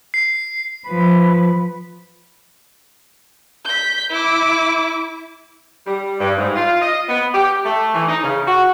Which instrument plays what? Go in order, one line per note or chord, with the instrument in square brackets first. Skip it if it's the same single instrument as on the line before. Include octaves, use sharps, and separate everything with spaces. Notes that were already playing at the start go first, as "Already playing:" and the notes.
[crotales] C7
[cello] F3 B4
[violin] G6 B6
E4 D6
[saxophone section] G3
G2
G#2
F4
D#5
B3
G4
A3
E3
D#4
C#3
F#4